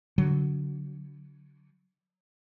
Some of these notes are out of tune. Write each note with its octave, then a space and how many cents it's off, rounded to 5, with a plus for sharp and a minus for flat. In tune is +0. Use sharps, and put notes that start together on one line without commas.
D3 -25 F#3 +0